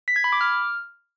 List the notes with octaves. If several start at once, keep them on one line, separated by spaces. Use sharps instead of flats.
B6
G#6
B5
D6
F6